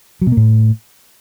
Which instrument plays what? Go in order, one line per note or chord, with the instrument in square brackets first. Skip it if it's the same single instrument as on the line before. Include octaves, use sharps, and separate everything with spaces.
[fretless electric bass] F#3
B2
A#3
A2